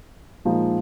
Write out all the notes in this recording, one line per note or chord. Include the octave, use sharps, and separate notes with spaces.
A#2 F3 G#3 D#4